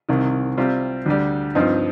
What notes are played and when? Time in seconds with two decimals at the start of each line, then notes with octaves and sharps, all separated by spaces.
0.09 C2 C3 D#3
0.58 C3 G3 C4 F4
1.06 D2 D3 G3
1.55 G2 F3 C4 D#4